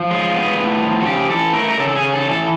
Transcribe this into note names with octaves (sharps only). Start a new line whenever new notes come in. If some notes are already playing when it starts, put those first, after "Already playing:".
Already playing: F3
G#3 F4
B3
A2
F3
F#4
C#3 G4
E3 A4
A3 A#4
A#4
C#3 A4
A4
G#4
C#3
A4
E3
A4